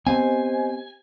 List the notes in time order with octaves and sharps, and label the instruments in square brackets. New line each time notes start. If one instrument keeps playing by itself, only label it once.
[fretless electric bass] B3 C4 [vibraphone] G4 C5 D#5 [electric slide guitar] G#5